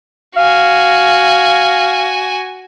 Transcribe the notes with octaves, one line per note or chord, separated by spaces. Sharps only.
F#4 F5 G#5